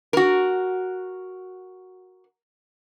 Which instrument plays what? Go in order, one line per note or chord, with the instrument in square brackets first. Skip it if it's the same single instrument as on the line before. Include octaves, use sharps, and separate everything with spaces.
[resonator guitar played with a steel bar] F#4 A#4